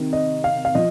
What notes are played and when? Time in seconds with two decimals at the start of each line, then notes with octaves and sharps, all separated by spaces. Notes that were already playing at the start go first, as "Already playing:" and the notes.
Already playing: C3 D#3
0.13 D#5
0.44 F5
0.65 F5
0.75 F3 D#5